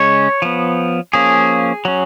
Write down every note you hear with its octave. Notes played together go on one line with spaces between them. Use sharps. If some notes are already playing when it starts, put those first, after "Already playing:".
Already playing: C#3 G#3 C#4 C#5
F3 B3
F3 A#3 C#4 G#4
F#3 C#4